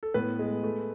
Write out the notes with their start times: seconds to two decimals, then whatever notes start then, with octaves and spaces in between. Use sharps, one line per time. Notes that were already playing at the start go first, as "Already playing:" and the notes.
0.03 A4
0.14 A2 B3 B4
0.39 G#3
0.64 A3